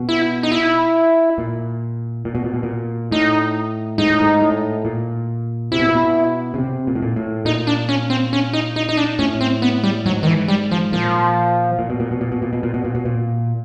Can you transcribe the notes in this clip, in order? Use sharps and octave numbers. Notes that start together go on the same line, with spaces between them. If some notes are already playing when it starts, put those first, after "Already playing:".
Already playing: B2
E4
D#4
E4
A#2
A#2
B2
A#2
B2
A#2
A2 D#4
G#2 D#4
A2
G#2
A2
A#2
C3 E4
B2
A#2
B2
C#3
C3
A#2
A2
A#2
A2
A#2 D#4
D4
C#4
C4
C#4
D#4
D#4
D#4
D4
A2 C#4
C4
B3
G3
G#2 F#3
D#3
E3
G3
F3
A#2 F3
A#2
B2
A#2
B2
A#2
B2
A#2
B2
A#2
B2
A#2
B2
A#2